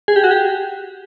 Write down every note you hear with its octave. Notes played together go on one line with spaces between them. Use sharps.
G#4
G4
F#4
G4